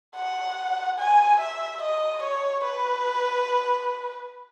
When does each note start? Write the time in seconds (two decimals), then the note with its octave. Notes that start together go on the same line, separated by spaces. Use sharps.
0.16 F#5
0.98 G#5
1.40 E5
1.82 D#5
2.23 C#5
2.64 B4